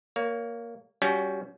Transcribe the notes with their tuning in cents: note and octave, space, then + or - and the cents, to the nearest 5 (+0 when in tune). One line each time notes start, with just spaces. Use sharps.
A#3 +0 C#5 +25
G3 +0 C#4 +25 F#4 +0